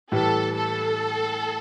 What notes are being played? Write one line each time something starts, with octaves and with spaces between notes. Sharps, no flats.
A2 E3 G3 A4
A4